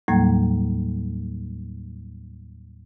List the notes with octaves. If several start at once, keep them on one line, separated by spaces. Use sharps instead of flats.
D#2 A2 F#3 G3 A#3 G#6